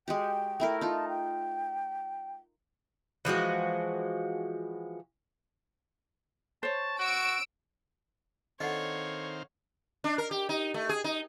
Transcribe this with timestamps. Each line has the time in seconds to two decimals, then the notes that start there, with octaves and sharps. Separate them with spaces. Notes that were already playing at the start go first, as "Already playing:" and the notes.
0.08 G#3 F#4 G4 G5
0.60 A3 E4 A#4
0.81 D#4 F4 A5
1.09 G5
3.25 E3 F3 G#3 F#4
6.63 C5 C#5 A5
6.99 F#4 E6 D7
8.60 D#3 C4 D4 A4 C#5 D#5 F5 F#5
10.04 D4
10.18 A#4
10.31 G4
10.49 D#4
10.74 A3
10.89 G#4
11.04 D#4